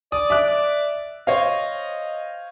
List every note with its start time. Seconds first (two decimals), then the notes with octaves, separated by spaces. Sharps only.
0.12 D5 D#6
0.30 E5 D6 F#6
1.27 C5 C#5 D#5 F5